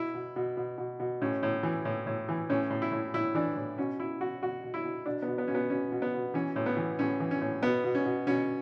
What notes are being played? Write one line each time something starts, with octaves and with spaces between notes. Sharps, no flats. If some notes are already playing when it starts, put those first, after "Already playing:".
Already playing: B2 E4
B2
B2
B2
B2
B2
A2 C#4
A2
E3
A2
A2
E3
A2 C#4
A2
E4
A2
A2 E4
E3 D4
A2
B2 C#4
B2 E4
B2 F#4
B2 F#4
B2
E4
B2
B2 D4
B3
B2
B3
B2 C#4
B3
B2 C#4
B2
B3
B2
E3 C#4
A2
B3
E3
A2 C#4
E3
C#4
A2
B2 B3
B2
C#4
B2
B2 C#4